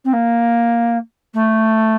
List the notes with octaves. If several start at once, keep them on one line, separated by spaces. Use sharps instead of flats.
C4
A#3
A3